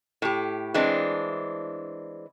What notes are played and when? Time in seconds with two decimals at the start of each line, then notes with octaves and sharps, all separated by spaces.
0.22 A2 G4
0.74 E3 G#3 C4 D4